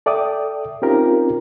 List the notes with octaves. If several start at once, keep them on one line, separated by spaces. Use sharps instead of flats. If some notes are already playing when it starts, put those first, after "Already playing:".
A4 D5 E5 G5 D6 D#6
C4 C#4 D#4 F4 G4 A#4